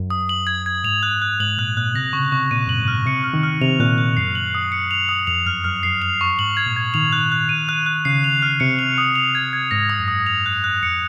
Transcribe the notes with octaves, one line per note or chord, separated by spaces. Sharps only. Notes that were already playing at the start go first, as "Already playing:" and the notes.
Already playing: F#2
D#6
F#7
G#6
G#6
G#2 F7
F#6
F#6
G#2 F#7
A#2 F#6
A#2 F#6
C3 A#6
C#3 C#6
C3 C#6
A#2 D#7
F#2 F#7
G#2
F6
C3 C#7
F6
D#3
F6
C3 F7
A#2 F#6
F#6
F#2 C7
F#7
D#6
C#7
F7
D#6
F2 F7
F#2 F6
F#2 F6
F#2 C7
F7
C#6
G#2 F#7
G#6
A#2
G#6
D#3 F7
F#6
F#6
D#7
F#6
F#6
C#3 C7
F7
F6
C3 C#7
F7
D#6
F7
G#6
G#6
G#2 A#6
D#6
F#2
D#6
F7
F#6
F#6
F2 C#7